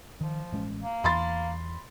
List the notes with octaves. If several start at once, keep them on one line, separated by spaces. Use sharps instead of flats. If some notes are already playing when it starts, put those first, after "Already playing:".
D#3 F3
A1 G#3 C#4
A#3
E2 E3 B5 C6 A6